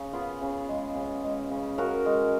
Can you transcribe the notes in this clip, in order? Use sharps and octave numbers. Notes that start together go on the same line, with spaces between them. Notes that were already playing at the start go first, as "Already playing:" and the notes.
Already playing: C#3
B3 F4 G#4
C#3
G#3
C#3
G#3
C#3
C#3 F#4 A#4
G#3